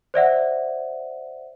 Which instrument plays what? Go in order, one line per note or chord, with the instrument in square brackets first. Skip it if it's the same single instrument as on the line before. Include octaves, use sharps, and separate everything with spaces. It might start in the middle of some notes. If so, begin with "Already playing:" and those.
[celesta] C5 D5 E5 F#5